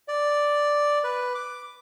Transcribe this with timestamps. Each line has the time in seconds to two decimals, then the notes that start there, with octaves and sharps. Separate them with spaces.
0.08 D5
1.04 B4
1.35 D6